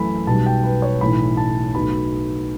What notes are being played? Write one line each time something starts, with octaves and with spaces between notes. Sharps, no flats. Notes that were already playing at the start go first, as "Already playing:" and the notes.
Already playing: F#2 E3 A3 B5
B1 B2 G3 A5
G5
B4
C#5
B1 A2 E3 B5
A5
B1 B2 A3 B5